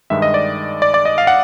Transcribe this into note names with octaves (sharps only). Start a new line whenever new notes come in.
G2 D#3 G#3 E5
D#5
D5
D5
D5
D#5
F5
F#5